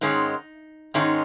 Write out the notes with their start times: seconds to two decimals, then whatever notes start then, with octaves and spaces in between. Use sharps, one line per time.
0.01 G#2 D#3 G#3 C#4 D#4
0.94 G#2 D#3 G#3 C#4 D#4